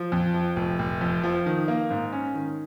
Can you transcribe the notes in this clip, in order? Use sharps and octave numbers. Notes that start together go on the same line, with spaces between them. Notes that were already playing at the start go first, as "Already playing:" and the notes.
Already playing: F3
F2
F3
F1
F1
F2
F3
D#3
A#3
G#2
C#4
D#3